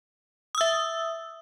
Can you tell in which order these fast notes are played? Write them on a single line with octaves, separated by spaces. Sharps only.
D#6 E6 E5